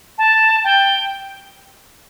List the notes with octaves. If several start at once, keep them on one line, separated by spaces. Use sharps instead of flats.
A5
G5